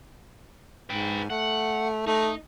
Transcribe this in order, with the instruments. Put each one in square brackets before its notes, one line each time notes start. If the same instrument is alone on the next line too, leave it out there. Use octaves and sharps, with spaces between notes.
[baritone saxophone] G#2 [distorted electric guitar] B4 G5
[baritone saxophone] A3 [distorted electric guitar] F#5
[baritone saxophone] A3 [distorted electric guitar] D#4